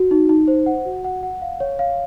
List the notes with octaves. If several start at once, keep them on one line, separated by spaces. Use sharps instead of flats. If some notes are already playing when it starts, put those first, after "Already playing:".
Already playing: F#4
D#4
D#4
C5
F#5
F#4
F#5
F#5
F5
C#5
F5